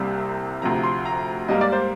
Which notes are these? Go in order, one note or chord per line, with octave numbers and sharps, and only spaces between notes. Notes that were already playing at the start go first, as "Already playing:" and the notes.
Already playing: C2 C3 G3 A#3
D2 C3 F3 A#5
C6
A#5
G#2 G3 A#3 D#5
D5
C5